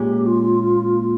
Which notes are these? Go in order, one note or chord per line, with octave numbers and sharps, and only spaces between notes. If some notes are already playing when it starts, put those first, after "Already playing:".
Already playing: A#2 G#3 C#4 G4
F4